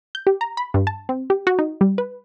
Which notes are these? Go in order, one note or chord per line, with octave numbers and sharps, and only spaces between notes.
G6
G4
A#5
B5
G2
A5
C4
G4
F#4
D#4
G3
B4